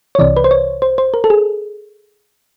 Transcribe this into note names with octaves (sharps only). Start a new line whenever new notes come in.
C#5
C2 C3 E3 D5
B4
C5
C#5
C5
C5
A#4
A4
G#4